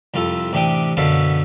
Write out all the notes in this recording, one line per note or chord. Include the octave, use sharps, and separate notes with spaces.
C2 F2 F4 A4
A1 C3 D4 G4 D#6
F#2 B2 D3 B3 A4 F5